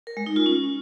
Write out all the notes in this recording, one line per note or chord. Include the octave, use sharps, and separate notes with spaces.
A#4
G#3
D#4
F4
C#4